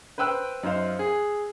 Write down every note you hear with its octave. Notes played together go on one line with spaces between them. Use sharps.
B4 C5 G5 E6 F#6
F#2 D#4 C5 F5
G#4